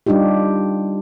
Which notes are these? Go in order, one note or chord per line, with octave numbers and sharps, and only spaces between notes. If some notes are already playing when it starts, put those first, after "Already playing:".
G3 D4 D#4 F4 G4